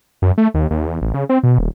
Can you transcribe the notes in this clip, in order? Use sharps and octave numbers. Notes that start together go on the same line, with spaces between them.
F#2
A3
D#2
D#2
E2
A1
C#3
C4
B2
D#1